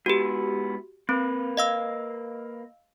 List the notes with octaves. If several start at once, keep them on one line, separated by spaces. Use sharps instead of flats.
G#2 B3 E4 F#4 G4
A#3 C4 B4
D#5 F5 E6